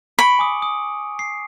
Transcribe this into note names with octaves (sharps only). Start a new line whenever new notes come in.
B5 C#6 C#7 D7
G#5 D6 D#6
D#6
C7